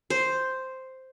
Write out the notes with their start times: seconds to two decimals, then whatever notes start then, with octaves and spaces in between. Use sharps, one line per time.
0.10 C5